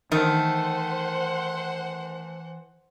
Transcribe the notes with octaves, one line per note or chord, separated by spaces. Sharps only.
D#3 E3 A3 C5 F#5